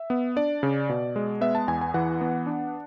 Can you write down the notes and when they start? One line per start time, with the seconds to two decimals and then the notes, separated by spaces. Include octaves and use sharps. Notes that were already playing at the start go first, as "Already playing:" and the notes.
Already playing: E5
0.10 B3
0.36 D4 D5
0.63 C#3
0.89 B2
1.16 G#3
1.41 B3 E5
1.55 A5
1.68 E2 G#5
1.81 G#5
1.94 E3 F#5
2.21 B3
2.46 D4